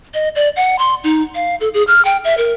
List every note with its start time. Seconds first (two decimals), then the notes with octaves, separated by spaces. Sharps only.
0.14 D#5
0.35 D5
0.56 F#5
0.79 C6
1.04 D#4
1.35 F5
1.61 A4
1.74 G#4
1.87 F6
2.05 G5
2.25 E5
2.38 A#4